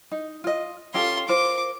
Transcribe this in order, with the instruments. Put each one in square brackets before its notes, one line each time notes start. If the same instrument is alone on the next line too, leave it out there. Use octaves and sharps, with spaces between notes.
[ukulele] D#4
F4 D#5
[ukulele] C#4 G4 A4 [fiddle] F4 C6
[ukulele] F4 A#4 C5 [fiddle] D6